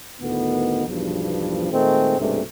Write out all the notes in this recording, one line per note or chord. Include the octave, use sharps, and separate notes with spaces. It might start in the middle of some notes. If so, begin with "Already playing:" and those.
D2 A2 D#3 B3
B1 E2 G2 F3
A#2 D#3 G#3 A3 C4
B1 G2 C3 G#3 A3